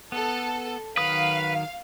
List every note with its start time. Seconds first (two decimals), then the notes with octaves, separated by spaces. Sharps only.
0.12 B3 A4
0.97 D#3 F#3 B4 F5 D#6